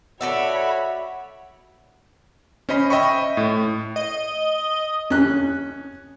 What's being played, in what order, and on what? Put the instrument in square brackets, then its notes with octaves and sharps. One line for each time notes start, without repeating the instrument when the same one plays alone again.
[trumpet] F#4 [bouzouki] A4 D5 E5 [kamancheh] C#5 B5 [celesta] F#5
[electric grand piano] C#4 C5 D#5 B5
D#5 E5 G5 B5 C#6
A2
[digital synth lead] D#5
[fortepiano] C#4 F#6